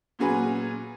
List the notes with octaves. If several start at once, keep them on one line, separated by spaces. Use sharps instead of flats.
A#2 F#3 C#4 G#4 B4